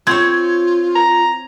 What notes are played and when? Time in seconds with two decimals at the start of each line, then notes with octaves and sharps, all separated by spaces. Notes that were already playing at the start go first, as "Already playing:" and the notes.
0.07 C4 F4 C#5 G#6
0.95 A#5